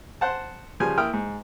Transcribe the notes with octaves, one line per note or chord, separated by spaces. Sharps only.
C5 F#5 A5
C#3 F3 G3 G#5
A#3 E4 G5 D#6 F6
G#2